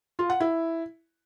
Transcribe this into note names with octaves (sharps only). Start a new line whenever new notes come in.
F4
F#5
E4